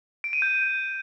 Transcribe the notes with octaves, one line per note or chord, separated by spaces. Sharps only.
D7
D#7
G6